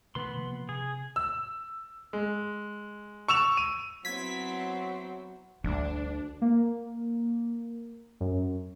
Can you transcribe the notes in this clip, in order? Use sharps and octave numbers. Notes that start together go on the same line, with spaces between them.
B2 D#3 A3 B3 B4 C6
C3 F3 A#3
C3 G#4
E6
G#3
C#6 E6 E7 F7
D#7
F#3 B3 C4 E4 G#6 B6
D2 G3 D4
A#3
F#2